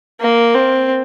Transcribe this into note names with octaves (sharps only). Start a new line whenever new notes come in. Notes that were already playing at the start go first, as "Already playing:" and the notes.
A#3
C4